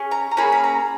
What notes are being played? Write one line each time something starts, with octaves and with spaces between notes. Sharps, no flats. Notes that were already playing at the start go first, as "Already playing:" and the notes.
Already playing: C#4 G#4
A#5
A#5
A#3 C#4 G#4 B5
B5
A#5